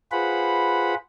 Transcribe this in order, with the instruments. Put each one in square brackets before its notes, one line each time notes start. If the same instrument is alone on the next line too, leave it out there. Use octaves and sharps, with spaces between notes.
[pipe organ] F4 G#4 B4 C5 F#5 B5